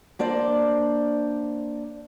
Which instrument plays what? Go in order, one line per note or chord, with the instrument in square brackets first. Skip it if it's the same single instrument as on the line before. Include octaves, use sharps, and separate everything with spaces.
[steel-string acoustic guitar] A#3 D4 C5 D5